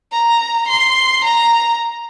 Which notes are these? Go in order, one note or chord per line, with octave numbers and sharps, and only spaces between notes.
A#5
C6
A#5